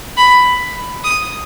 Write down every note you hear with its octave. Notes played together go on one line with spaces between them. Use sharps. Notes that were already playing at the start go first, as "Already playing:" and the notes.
B5
D#6